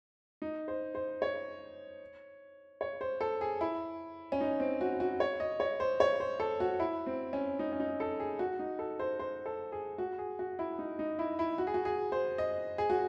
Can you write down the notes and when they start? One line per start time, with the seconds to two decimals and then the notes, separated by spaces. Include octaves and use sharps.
0.42 D#4
0.68 C5
0.95 C5
1.22 C#5
2.81 C#5
3.01 C5
3.21 A4
3.41 G#4
3.61 E4
4.32 C#4
4.41 D#4
4.60 C4
4.81 F#4
5.00 F#4
5.20 C#5
5.40 D#5
5.60 C#5
5.80 C5
6.00 C#5
6.20 C5
6.40 A4
6.60 F#4
6.80 E4
7.06 C4
7.33 C#4
7.59 D#4
7.72 C#4
7.80 D#4
8.00 A4
8.20 G#4
8.39 F#4
8.59 D#4
8.79 A4
8.99 C5
9.19 C5
9.46 A4
9.72 G#4
9.98 F#4
10.18 G#4
10.39 F#4
10.59 E4
10.79 D#4
10.99 D#4
11.19 E4
11.39 E4
11.58 F#4
11.67 G#4
11.74 F#4
11.85 G#4
12.12 C5
12.38 D#5
12.78 G#4
12.90 F#4